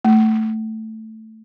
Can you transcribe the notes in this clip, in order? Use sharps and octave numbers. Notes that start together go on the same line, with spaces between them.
A3